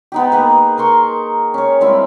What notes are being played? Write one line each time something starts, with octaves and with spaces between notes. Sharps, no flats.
B3 D#4 G4
A#3 G#4 B4
A#4 A#5 C6 C#6
C#4 C#5
G3 G#3 C4 E4